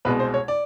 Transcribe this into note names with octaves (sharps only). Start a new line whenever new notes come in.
C2 B2 G#3 B3 B4
C5
C#5
D5